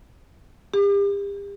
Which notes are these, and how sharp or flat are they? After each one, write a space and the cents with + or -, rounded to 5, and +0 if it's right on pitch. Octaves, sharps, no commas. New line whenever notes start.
G4 +40